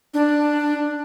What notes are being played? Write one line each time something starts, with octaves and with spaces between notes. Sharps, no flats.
D4